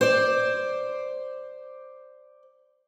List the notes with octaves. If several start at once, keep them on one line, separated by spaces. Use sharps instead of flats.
C5 D5